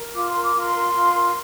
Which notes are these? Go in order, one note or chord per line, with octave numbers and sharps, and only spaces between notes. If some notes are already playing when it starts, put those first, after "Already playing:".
Already playing: A#4
F4 D6
A#4 C6
D6
F4 C6
A#4
F4
A#4